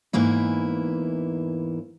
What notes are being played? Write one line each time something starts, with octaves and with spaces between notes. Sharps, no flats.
E2 G#2 E3 A#3 E4